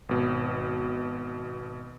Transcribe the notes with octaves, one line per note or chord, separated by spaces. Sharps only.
G#1 B2